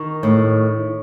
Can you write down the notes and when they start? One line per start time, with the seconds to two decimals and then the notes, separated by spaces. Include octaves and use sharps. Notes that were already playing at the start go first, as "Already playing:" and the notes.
Already playing: D#3 C#6
0.23 A2